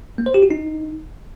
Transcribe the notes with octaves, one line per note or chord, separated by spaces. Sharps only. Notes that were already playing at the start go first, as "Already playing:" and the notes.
A#3
C5
G4
F#4
D#4